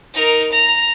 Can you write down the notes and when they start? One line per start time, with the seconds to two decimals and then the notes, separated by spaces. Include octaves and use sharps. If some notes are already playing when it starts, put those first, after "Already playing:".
0.14 D#4 A#4
0.51 A#5